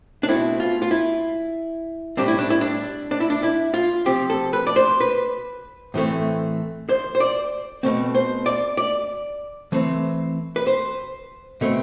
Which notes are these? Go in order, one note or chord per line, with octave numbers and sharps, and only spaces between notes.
D4
B2 A3 C4 E4
F4
F4
E4
A2 G3 C4 D4
E4
D4
E4
D4
D4
E4
D4
E4
F4
C3 F3 C4 G4
A4
B4
D5
C5
B4
A2 E3 A3 C4
C5
C5
D5
B2 A3 C4
C5
D5
D5
E3 A3 C4
B4
C5
B2 A3 C4